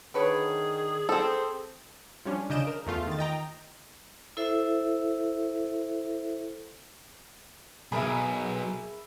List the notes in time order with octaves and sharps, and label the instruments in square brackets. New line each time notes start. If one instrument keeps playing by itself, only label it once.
[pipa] D3 B4 C#5 [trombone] D#3 [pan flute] G#4
[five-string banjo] C4 A4 [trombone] C5
[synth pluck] F3 G3 C#4 D4
C#3 D4 D#5 G6 D7 E7
A#4
E2 A3 F4
D#3 A6
D#5 G5 A#5
[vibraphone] E4 A4 C5 E5
[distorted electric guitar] B1 B2 [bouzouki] G#4 A#4 G#5 [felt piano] E5 B5